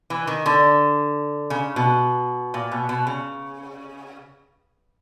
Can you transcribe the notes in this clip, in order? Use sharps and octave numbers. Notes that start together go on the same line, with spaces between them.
E3
D#3
D3
C#3
B2
A#2
B2
B2
C#3